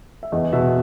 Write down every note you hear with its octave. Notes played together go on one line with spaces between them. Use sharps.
E5
E2 D#5
B2 E5